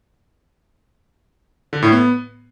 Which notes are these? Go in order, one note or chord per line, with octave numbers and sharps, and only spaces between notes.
D3
A2
B3